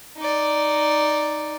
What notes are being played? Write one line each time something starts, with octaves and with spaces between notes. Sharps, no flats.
D#4 D5